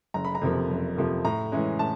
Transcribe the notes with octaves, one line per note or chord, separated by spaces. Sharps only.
F#1 A#5
B5
A#5
F2 C3 F3 A#3
F#1
F2 C3 F3 A#3
A2 A#5
E3 G#3 C#4
A2 A5